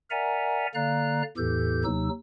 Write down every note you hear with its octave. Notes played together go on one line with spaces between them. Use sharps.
A#4 D5 E5 F#5 G#5 A#5
D3 A#3 D5 F5 A#5 F#6
E2 A2 E3 G4 A4 G6
D#2 C3 F#3 D#4 E6